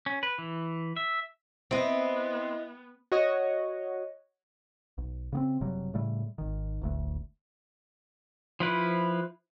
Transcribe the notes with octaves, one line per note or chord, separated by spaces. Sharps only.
C#4
B4
E3
E5
B3 C4 E4 D#5
F#4 C#5 D#5
B1
C#3 B3 C4
F#1 C3 F#3 G3
A2 C#3 G3 A3
G#1 D#3
D1 G1 D2 A3
F3 E4 B4